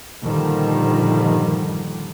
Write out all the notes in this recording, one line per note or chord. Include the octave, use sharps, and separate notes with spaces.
G2 A#2 D3 D#3 F3 G3